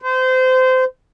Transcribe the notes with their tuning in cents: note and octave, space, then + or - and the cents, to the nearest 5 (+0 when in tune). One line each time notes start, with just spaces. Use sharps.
C5 -25